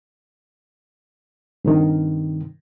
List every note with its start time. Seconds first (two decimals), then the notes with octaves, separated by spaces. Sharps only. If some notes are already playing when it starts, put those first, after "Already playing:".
1.65 G2 C3 D#3